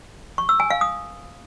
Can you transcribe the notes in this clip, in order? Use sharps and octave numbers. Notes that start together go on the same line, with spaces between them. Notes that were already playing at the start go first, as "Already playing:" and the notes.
C#6
E6
G#5
F5
D#6